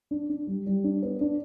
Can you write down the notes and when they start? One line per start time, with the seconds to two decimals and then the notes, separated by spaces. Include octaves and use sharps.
0.11 D4
0.29 D4
0.47 G3
0.66 G3
0.84 D4
1.03 B3
1.21 D4